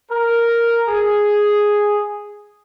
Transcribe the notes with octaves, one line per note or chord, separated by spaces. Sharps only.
A#4
G#4